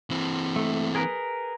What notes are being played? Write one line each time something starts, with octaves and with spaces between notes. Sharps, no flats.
E3 C4
A3
G#4 A#4 B4